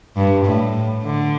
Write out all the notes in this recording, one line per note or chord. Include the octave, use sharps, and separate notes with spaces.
G2
A2
D3